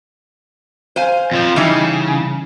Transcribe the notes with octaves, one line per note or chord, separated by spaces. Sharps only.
C5 F5 G#5
F2 F3
C#3 E3 G3 D#4